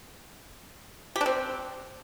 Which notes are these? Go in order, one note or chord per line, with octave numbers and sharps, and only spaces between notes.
G4
D4
C4